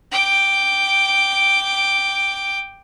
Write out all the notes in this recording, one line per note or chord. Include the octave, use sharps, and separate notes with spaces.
G5 D6